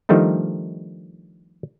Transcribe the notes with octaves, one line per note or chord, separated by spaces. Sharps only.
D#3 F3 G3 A3 D4 D#4